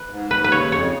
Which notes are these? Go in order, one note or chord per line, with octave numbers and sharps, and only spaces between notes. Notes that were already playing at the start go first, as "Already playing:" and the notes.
Already playing: B4
G#2
D#2 B4
B4
C#3 C#5
F2 C#5